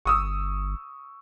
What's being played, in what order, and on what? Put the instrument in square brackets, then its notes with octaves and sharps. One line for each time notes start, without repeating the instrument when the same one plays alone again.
[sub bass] G1 [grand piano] C#6 D#6 E6